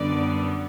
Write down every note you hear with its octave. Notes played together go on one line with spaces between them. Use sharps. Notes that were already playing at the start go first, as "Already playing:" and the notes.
Already playing: F#2 D3 G3 B3 D5